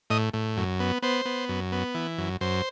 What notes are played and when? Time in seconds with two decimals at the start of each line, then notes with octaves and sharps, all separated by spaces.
0.10 A2 D#5
0.33 A2
0.57 F#2
0.80 B3
1.02 B3 C5
1.25 B3
1.49 F#2
1.72 B3
1.94 E3
2.18 F#2
2.41 F#2 C5